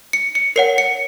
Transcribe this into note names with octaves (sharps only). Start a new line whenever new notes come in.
C#7
C#7
A#4 C#5 F#5 C7
C#7